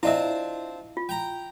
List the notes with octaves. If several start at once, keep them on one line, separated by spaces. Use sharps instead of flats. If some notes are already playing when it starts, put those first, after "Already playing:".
C4 D4 E4 F4 D#5 E5
F4
G5 A#5